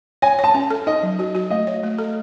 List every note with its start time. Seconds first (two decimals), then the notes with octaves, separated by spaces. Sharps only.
0.22 C#5 G#5
0.39 C#5
0.44 A5
0.54 C#4
0.70 A4
0.87 D#4 D#5
1.03 F#3
1.19 F#4
1.35 F#4
1.50 A3 D#5
1.67 C#5
1.83 A3
1.98 A4